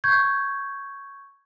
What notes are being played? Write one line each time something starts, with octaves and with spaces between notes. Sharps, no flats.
C#6 G6 G#6